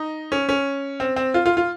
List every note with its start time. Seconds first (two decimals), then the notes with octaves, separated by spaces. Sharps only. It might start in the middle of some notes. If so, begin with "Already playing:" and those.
Already playing: D#4
0.32 C#4
0.49 C#4
1.00 C4
1.16 C4
1.34 F4
1.46 F4
1.57 F4